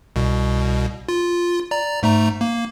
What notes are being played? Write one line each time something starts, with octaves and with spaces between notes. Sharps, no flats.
C2 B2
F4
D5 A#5
G#2 A3 A#5
A#3